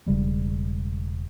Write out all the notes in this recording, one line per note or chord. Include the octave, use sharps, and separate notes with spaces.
E1 C#3 G3 G#3